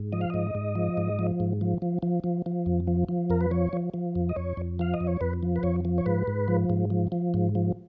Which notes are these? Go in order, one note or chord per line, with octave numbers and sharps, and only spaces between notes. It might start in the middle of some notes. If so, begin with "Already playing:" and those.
Already playing: G#2
F3 D#5
F5
G#2 D#5
G#2
F3
G#2
F3
G#2
F3
F3
F3
F3
F3
F2
F3
F3
F2 A#4
B4
F3 C#5
F3
F3
F2
D#5
F2 C#5
F2
F3 F5
D#5
F2
C#5
F2 B4
F3
B4
F2 C#5
F3
C#5
G#2 B4
G#2
F3
G#2
F3
F3
G#2
F3